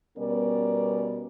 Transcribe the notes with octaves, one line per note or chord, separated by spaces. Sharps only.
B2 G3 B3 C#4 A#4 D5